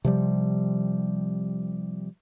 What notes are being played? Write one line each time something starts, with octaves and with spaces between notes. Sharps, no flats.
C3 F3 G3